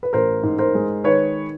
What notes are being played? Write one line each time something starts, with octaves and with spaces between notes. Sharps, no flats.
B4
A1 A#4 C5
G#2
A#4 C5
G#3
D#3 B4 C#5